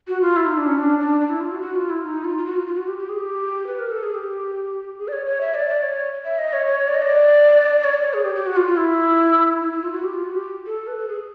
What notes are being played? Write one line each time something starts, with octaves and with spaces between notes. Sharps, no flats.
F#4
F4
E4
D#4
D4
C#4
D4
D4
D4
E4
F4
F#4
F#4
F4
E4
D#4
F4
F4
F#4
F4
F4
F#4
G4
G4
G#4
G4
B4
A#4
A4
G#4
G4
G#4
D5
C#5
C#5
E5
D5
D5
C#5
E5
D#5
C#5
C#5
D5
D#5
D5
C#5
D5
C#5
G#4
G4
G4
F#4
F4
F4
E4
E4
E4
F4
F#4
G4
F4
F#4
G4
A4
B4
A4
G#4